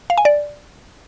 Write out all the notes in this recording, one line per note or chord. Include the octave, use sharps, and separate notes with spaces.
F5
G#5
D5